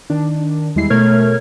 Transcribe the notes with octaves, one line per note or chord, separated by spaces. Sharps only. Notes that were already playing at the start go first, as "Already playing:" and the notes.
D#3 D4
E2 G3 G#3 E4 C7
B2 A3 A#4 C#5 F6 G#6